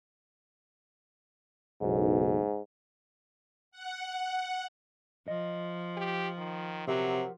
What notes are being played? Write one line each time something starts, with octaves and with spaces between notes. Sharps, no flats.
F#1 B1 G#2
F#5
F3 D#5
G4
D#3
C3 F#3 G4 A#4 F#5